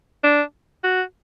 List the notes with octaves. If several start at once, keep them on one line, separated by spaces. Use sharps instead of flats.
D4
F#4